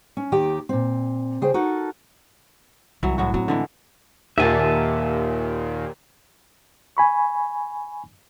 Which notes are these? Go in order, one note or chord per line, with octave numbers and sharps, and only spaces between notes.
C#4
D#2 D#3 G4 G5
A#2 C4
C#3 G#4 C5 G5
D#4 F#4 A4 A#4
C2 E3 F#3
A2 F#3 F#4
F#3 C4
D3 E3 G#3
D#2 A#2 G4 A#4 E5 F#5 G#5 A5
G#5 B5 C#6